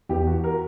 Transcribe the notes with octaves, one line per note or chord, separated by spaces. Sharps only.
E2 G4
F#4
A#4